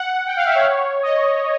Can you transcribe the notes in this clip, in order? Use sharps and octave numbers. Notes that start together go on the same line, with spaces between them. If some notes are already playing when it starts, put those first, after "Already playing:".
Already playing: F#5
G5
F5
E5
C#5
D#5